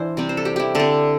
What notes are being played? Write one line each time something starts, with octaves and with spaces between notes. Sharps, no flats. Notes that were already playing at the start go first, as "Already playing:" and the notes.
Already playing: E3 D4 E4 C5
C3 G3 C4
C5
A4
G4
E4 G4
D3 C4 A4